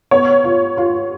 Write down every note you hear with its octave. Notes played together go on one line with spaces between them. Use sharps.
B3 C#5
F4
F4